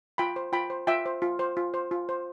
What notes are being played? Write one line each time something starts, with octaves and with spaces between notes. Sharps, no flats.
F4 G5 B5
C5
F4 G5 B5
C5
F4 E5 G5
C5
F4
C5
F4
C5
F4
C5